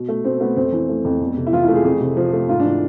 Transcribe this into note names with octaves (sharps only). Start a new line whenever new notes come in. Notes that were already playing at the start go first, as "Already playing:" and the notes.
Already playing: B2
A3
B2 C4
A3 B3
F2 C4
E3
A3
F2
E2
C3
E4
E3 F4
E4
A3
G#4
F2 G#4
C3
F3
A3
G#2 F4
D4
E3